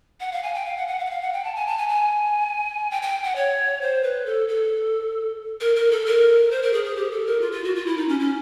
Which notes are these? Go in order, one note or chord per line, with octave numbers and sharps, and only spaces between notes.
F#5
F5
G#5
G5
F5
F#5
F#5
F5
F#5
F5
F#5
G5
A5
G#5
A5
G#5
G#5
G5
G5
F#5
C#5
C5
B4
A4
A4
A#4
A#4
A4
A#4
C5
A#4
G#4
G#4
G4
A4
A#4
F4
F4
F#4
F4
E4
D#4
C#4
C#4